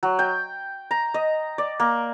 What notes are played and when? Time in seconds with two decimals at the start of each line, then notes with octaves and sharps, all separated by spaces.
0.03 F#3
0.19 G5
0.91 A#5
1.14 D#5
1.58 D5
1.80 A#3